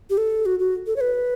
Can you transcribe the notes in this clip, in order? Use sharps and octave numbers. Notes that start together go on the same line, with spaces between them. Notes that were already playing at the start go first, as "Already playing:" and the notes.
G4
A4
F#4
F#4
A4
C#5
B4